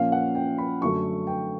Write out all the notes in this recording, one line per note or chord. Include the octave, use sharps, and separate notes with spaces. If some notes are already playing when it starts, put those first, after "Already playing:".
Already playing: A#2 F3 A#3 C#4 F5
F#5
G5
B5
F#2 D3 F#3 A3 C#6
G5